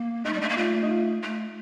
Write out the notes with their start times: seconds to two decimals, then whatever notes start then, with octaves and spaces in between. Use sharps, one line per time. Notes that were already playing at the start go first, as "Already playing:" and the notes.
Already playing: A#3
0.25 A3 D#4
0.33 G3 D4
0.41 A3 D#4
0.49 A#3
0.57 A3 F4
0.83 D#4
0.89 F4
1.22 A3